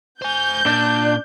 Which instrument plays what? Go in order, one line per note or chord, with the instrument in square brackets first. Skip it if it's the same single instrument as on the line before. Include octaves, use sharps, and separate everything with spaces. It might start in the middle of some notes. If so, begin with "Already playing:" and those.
[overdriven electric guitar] C5 G#5 [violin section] G6
[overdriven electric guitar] A#2 [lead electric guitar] D4